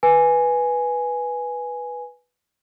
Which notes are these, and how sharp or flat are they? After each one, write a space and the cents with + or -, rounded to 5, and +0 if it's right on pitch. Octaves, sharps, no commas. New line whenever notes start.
B4 -10 G#5 +0